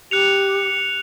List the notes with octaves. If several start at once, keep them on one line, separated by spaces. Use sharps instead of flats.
G4 F#6 C#7 F7